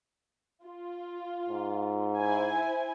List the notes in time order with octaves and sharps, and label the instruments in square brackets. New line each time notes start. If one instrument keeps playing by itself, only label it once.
[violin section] F4
[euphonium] G#2
[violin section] E4 C5 G#5